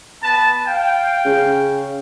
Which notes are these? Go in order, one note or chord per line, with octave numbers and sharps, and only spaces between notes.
B3 B4 A5
F5 G5
C#3